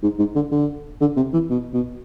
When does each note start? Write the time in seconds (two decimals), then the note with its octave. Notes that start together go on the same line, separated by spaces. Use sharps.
0.03 G#2
0.19 G#2
0.35 D3
0.51 D3
1.01 D3
1.16 C3
1.33 E3
1.50 B2
1.73 B2